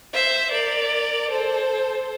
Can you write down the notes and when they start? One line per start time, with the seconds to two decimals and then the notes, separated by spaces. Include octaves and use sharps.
0.13 C5 E5
0.51 A#4 D5
1.29 A4 C5